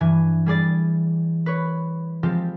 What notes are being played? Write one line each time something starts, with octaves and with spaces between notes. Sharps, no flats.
G2 E3 G#5
G3 G#4 D5 A6
B4 C#5
F3 G#3 C4 F4 G4